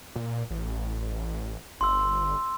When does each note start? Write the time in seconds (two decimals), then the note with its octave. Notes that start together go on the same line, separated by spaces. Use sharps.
0.16 A#2
0.50 A1
1.81 G1 C6 E6